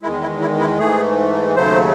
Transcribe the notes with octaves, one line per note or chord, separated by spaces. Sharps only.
E2 D#3 G#3 E4
E4
E4
E4
G#2 E3 A3 G#4
D#2 C#3 F#3 A3 C5